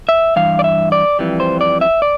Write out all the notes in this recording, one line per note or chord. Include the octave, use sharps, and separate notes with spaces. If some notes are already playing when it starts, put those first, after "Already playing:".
E5
G2 E3 F5
D5
E5
D5
F2 E3 G3
C5
D5
E5
D5